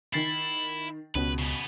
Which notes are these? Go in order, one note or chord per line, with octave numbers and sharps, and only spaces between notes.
D#3 E4 A6 C7
C#2 B2 C#4 B4
C#3 B3